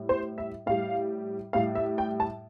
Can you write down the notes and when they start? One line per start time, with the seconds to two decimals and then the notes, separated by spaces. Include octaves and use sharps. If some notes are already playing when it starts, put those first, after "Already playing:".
Already playing: A2 G3
0.09 C5
0.38 E5
0.66 A2 G3 F5
1.53 A2 G3 F5
1.75 E5
1.98 G5
2.20 A5